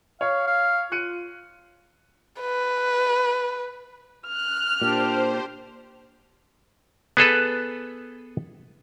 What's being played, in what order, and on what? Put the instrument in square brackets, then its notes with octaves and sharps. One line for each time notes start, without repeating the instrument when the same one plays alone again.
[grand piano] C#5 [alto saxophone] F5
[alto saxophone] F5
[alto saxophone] F4 [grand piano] F#6 C#7 D#7
[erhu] B4
[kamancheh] F6 [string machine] F#6
[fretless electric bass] A#2 [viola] D4 G4 [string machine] C5
[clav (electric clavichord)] B3 G#4 A4 B4